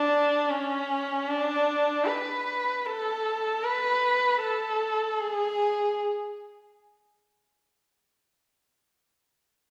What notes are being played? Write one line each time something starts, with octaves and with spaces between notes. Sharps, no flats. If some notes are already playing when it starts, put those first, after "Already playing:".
Already playing: D4
C#4
D4
B4
A4
B4
A4
G#4